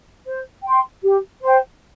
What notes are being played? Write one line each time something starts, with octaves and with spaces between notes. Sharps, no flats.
C5
G5 C6
G4
C5 G5